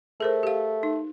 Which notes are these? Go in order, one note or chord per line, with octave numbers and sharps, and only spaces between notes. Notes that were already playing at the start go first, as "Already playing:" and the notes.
A3 G#4 A#4 C5
G4 F5
D#4